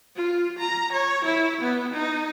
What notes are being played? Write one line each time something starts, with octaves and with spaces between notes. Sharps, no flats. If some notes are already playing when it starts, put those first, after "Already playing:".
F4
A#5
C#5
E4
B3
D#4